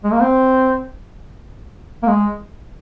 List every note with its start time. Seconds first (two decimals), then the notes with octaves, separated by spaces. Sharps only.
0.04 G#3
0.13 A#3
0.21 C4
2.03 A#3
2.08 G#3